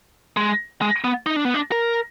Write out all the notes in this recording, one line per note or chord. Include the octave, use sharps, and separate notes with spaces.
G#3
G#3
B3
D#4
D4
B3
D4
A#4